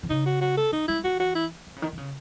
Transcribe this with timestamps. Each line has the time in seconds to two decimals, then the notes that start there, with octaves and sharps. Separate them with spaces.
0.03 D#3
0.10 C#3 D#4
0.26 F#4
0.41 F#4
0.57 A4
0.72 D#3 D#4
0.88 G#3 E4
1.04 E3 F#4
1.20 F#4
1.35 E4
1.67 E3
1.76 C#3
1.82 D#3
1.93 D#3
1.97 C#3